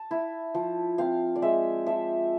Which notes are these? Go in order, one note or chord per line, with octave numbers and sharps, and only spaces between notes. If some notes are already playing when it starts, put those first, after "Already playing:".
Already playing: A5
E4
F3
C4 F5
D5
G#3 E5
F3 E5